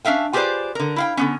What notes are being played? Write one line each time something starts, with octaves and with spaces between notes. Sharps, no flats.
C#4 D4 E5 F5 G5
F4 G4 G#4 B4 C5 D5
D3 A#4
E4 F5 G5
D3 B3 C#4